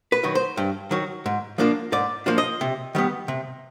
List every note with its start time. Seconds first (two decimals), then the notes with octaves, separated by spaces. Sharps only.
0.12 B4
0.23 D#3 F#3
0.35 C5
0.57 G2
0.91 D#3 F#3
1.26 G#2
1.58 F3 A#3 D4 F4
1.92 G#2 D5
2.26 F3 A#3 D4 F4
2.38 D#5
2.61 C3
2.95 D#3 G3 B3
3.28 C3